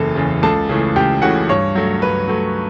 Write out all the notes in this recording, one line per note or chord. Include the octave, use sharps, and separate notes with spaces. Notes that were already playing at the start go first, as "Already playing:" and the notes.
Already playing: F#1 E2 C#3 A4 A5
E2 C#3
C#2 A4 A5
C#3 E3 A3
C#2 G4 G5
C#3 E3 A3 F#4 F#5
G2 C#5
F#3 A3
G2 B4
F#3 A3